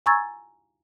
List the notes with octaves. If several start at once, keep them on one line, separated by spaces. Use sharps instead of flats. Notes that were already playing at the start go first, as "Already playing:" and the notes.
G#5 A#5 C#6 E6 G#6 A6